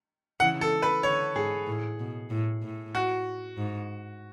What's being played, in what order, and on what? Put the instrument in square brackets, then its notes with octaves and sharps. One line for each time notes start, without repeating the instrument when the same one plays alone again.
[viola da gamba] C#3 E3 [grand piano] F#5
[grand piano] A4
B4
[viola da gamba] D3 [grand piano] C#5
[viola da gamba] G#2 [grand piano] G#4
[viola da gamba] A2
B2
A2
A2
[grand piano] F#4
[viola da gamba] G#2